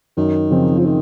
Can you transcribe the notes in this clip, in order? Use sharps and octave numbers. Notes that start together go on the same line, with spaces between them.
F#2 D#3
C#3 F3 C4 D#4
F3
D#3